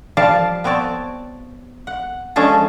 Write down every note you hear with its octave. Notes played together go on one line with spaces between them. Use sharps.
F3 G3 D5 F5 A5
B3 C4 C#5 D5 A5
F#5
F3 G#3 C#4 D4 G#4 A4